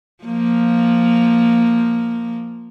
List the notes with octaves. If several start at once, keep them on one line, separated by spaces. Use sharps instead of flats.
F3 A#3